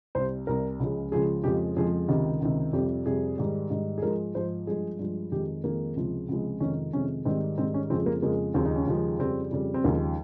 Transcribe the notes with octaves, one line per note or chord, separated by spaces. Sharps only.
C2 C3 G3 C5
C2 C3 G3 A#4
C#2 C#3 F3 G#3
C#2 C#3 F3 G#3 G#4
F2 C#3 F3 G#3 G4
F2 C#3 F3 G#3 G#4
C#2 C3 D#3 G4
C#2 C3 D#3
F2 C3 G3 G4
F2 C3 G3 G#4
G#2 D#3 G3
G#2 D#3 G3
G#4
G#2 F3 G#3 A#4
G#2 F3 G#3 C5
G2 F3 G#3 G#4
G2 F3 G#3
F2 D#3 G#3 G4
F2 D#3 G#3 A#3
C#2 C3 F3 G#3
C#2 C3 F3 G#3
F2 C3 D#3 G#3 C#4
F2 C3 D#3 G#3 C#4
G#2 D#3 G3 C4
G#2 D#3 G3 C4
C#4
F2 C#3 F3 G#3 C4
A#3
F2 C#3 F3 G#3 A#3
D#2 C#3 F3 G#3 C4
D#4
C#4
D#2 C#3 F3 G#3
F2 C#3 G3 C4
F2 C#3 G3
C4
D#2 C#3 F3 G#3 A#3